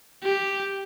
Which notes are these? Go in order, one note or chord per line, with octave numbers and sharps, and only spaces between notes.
G4